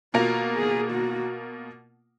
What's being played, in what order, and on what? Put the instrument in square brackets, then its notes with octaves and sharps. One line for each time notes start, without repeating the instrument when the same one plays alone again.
[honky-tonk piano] B2 A#3 F4 A#4 [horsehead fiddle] F#4
[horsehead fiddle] G#4
F#4